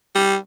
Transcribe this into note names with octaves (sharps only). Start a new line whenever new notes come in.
G3